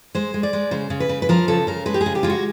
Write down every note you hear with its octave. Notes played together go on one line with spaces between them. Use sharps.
G#3 C5
G#3
D5
G#3
C#3 C5
C#3
B4
C#3
B4
F3 A#4
C#3 A4
C#3 A#4
G#3 B4
G4
G#4
C#3
G4
G#3 F4
F#4